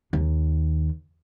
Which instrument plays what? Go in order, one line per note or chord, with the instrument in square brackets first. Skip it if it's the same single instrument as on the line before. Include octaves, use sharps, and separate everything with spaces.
[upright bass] D#2